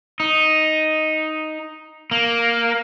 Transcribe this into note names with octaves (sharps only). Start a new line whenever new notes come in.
D#4
A#3